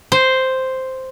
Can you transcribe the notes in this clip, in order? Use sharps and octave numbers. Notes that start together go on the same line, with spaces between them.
C5